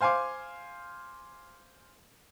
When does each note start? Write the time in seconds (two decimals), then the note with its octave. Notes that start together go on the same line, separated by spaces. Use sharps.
0.01 C5 F5 G#5 C6 D6